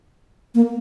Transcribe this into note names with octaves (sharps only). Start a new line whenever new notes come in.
A#3